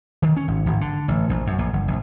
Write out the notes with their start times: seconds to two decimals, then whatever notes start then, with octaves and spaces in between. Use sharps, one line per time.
0.22 D#3
0.37 C#4
0.48 G#1
0.66 G#1
0.81 D3
1.08 A1
1.29 A#1
1.47 F#2
1.58 A#1
1.73 G1
1.88 A#1